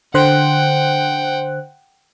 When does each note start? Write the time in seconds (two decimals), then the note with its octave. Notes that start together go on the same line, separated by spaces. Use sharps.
0.14 D3 C5 F#5 G5 F#6